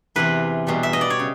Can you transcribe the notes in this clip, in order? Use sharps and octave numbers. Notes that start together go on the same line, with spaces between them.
E2 C3 E3 B4
E2 B2 G3
E5
D#5
D5
C#5
C#3